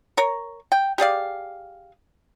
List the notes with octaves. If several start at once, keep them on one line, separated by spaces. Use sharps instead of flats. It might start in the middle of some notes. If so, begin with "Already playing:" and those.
A#4 C#5
G5
G4 G#4 D5 F5